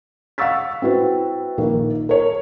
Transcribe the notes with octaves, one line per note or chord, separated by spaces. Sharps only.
F5 F#5 C#6 E6 A6 B6
C4 E4 F#4 B4
A#1 D#3 A#3
A#4 C#5